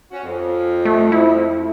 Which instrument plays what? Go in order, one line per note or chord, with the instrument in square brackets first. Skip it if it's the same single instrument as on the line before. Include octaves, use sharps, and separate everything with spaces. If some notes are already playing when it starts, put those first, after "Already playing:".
[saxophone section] C#4 F#4
F2
[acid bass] A3
E4